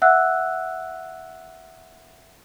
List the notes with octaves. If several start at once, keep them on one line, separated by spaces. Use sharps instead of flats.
E5 F#5 E6 F#6